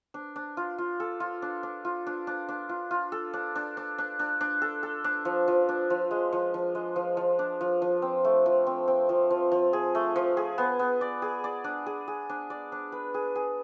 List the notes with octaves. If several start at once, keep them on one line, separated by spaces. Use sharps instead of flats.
D4
D4
F4
F4
A4
F4
D4
D4
F4
D4
D4
D4
F4
F4
A4
D4
D4
D4
D4
D4
D4
A4
A4
D4
F3
F3
D4
F3
G#3
F3
F3
G#3
F3
F3
D4
F3
F3
C4
A3
F3
C4
C4
F3
F3
F3
G#4
A3
F3
G#4
B3
B3
D5
G#4
D5
D4
G#4
G#4
D4
D5
D4
B4
G#4
G#4